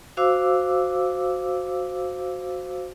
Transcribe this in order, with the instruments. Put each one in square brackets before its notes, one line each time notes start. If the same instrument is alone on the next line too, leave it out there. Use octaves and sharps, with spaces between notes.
[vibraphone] F#4 C5 F5 D6 E6